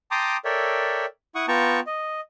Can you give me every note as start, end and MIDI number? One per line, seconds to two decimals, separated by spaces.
0.11 0.37 79
0.11 0.37 81
0.11 0.37 82
0.11 0.37 84
0.11 0.37 86
0.11 0.37 87
0.45 1.06 69
0.45 1.06 70
0.45 1.06 73
0.45 1.06 74
0.45 1.06 76
0.45 1.06 79
1.35 1.46 64
1.35 1.46 78
1.35 1.46 85
1.35 1.46 87
1.48 1.80 59
1.48 1.80 65
1.48 1.80 79
1.48 1.80 81
1.48 1.80 82
1.48 1.80 85
1.87 2.21 75